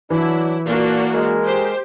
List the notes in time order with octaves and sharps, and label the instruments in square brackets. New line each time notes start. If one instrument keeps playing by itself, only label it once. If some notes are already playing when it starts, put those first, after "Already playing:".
[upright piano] E3 [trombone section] F#3 D4 [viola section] E4
[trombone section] A#2 [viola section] A#3 D4 F#4
[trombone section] G#3 A#4
[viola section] G4 C5